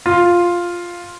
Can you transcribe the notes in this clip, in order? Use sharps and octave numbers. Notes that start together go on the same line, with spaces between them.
F4